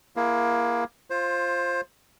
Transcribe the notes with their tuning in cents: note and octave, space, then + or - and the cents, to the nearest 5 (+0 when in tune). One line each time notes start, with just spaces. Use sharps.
A#3 +20 E4 +30 G#4 +0
F4 -5 C5 +20